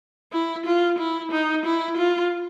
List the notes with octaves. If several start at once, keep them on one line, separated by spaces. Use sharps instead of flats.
E4
F4
E4
D#4
E4
F4